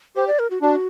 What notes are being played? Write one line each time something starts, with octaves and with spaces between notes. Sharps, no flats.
G4 C5
D5
A#4
F#4
D4 F#4